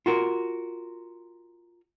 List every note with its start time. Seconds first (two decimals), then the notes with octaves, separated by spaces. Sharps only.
0.06 F4 F#4 A#4